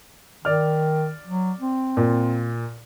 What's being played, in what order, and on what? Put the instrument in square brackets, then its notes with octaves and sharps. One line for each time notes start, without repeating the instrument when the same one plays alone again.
[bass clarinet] D#3 [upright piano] D5 F6
[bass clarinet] F#3
C4
[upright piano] A#2